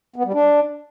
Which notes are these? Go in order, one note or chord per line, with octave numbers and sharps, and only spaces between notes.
B3
G3
D4